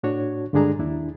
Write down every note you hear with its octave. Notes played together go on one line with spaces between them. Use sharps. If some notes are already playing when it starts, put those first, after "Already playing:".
A2 D4 F#4 C#5
G2 D3 G#3 D4 G#4 A#5
D#2 D4 E4